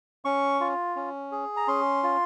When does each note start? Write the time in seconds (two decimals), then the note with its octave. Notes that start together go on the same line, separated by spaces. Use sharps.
0.25 C#4 C#6
0.61 F4
0.96 C#4
1.32 G#4
1.57 A#5
1.68 C#4 C6
2.03 F4